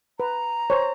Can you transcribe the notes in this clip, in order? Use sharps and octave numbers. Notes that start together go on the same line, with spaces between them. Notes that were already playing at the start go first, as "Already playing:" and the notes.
B4 A#5
C5 C#5